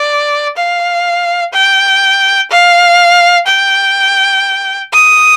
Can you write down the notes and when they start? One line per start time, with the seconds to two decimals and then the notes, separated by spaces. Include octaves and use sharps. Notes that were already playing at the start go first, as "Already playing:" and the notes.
Already playing: D5
0.57 F5
1.53 G5
2.51 F5
3.47 G5
4.93 D#6